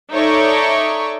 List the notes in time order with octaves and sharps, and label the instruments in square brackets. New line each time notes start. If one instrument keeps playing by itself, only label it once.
[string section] D#4 A4 C#5 D5 E5 C#6